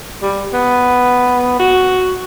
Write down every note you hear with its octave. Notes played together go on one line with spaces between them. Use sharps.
G3
B3
F#4